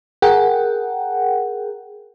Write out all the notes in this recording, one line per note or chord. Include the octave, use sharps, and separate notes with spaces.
G#4 A#4 F#5 G5